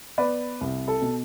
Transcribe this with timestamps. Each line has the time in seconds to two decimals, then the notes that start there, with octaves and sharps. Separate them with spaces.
0.18 B3 B4 D5
0.61 C2
0.88 A4
1.02 B2